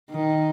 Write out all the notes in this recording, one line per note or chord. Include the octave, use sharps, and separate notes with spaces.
D#3